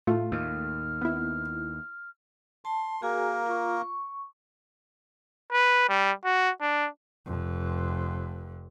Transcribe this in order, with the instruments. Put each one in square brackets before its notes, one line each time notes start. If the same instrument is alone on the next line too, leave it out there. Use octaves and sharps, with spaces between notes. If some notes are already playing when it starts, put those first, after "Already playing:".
[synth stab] A2 A3 [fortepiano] F4
[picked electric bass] D#2 [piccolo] F6
[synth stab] B3 E4
[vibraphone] A5 [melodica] C6
[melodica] A#3 A#4 [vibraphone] F#4 G#4 G#5
[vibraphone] F4 C#6
C#6
[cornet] B4
G3
F#4
D4
[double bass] F1 F2